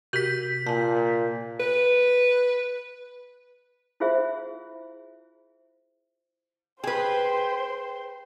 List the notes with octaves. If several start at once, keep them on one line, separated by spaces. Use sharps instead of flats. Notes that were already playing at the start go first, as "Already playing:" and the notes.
C3 F#4 G4 G6 B6
A#2 G#5 A5
B4
E4 F4 G#4 C5 E5
G#4 B4 C5 G5 C6